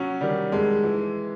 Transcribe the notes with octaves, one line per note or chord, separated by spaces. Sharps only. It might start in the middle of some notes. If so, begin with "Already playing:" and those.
Already playing: F#3 C#4
D#3 G3
F2 G#3
E3